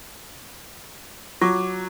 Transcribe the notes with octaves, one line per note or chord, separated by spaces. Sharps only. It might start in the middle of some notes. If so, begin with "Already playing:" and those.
F#3 F4 C#6 D6